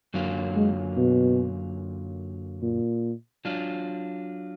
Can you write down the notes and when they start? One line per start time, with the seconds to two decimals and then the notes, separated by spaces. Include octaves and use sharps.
0.14 F#2 D3 F#3 A#3 F4
0.56 G#3
0.97 B2
2.62 A#2
3.45 F#3 D4 F4